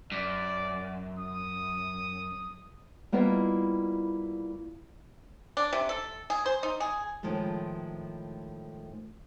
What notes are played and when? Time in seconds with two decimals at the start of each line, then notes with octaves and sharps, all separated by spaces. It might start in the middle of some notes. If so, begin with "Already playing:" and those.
0.12 F#2 D5
1.18 D#6
3.12 G3 A#3 B3 E4 F4 D#5
5.57 D4
5.73 C3
5.89 A4
6.30 G#4
6.46 C5
6.63 D#4
6.80 G#4
7.23 A2 D#3 F3 G#3 A3